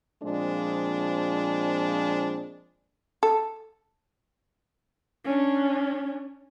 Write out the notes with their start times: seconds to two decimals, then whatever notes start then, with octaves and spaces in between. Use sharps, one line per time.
0.22 A#2 F3 G#3 C4 D4
3.23 A4
5.24 C#4 D4